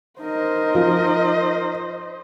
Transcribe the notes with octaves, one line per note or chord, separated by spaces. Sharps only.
D#4 A#4 C5 D#5
F3